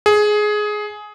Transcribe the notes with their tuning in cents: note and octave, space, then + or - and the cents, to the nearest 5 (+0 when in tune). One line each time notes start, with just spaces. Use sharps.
G#4 +15